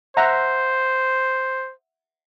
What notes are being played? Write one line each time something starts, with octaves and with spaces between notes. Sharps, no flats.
C5 E5 F#5 A#5